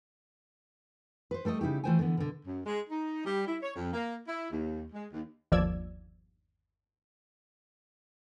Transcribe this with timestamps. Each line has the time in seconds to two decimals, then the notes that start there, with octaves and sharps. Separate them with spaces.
1.31 B4 C5
1.45 G3 A3 A4 C5 D#5
1.61 C#3 D#4 E4 G4
1.84 E3 A3 F4 C5 G5 G#5
1.99 D3 E3 B3
2.17 B2 D3
2.45 F#2
2.64 G#3
2.90 D#4
3.25 G3
3.46 E4
3.61 C#5
3.75 F2
3.93 A#3
4.27 E4
4.51 D#2
4.93 G#3
5.12 D#2
5.52 G1 D#2 F3 D5 E6 G#6